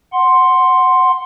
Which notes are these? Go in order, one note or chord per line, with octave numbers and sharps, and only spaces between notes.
F#5 C6